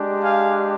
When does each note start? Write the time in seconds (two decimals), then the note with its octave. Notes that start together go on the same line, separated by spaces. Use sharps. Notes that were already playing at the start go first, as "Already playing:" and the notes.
Already playing: G#3 D4 G4
0.23 F5 G#5